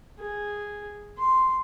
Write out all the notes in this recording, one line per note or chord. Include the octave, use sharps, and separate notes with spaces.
G#4
C6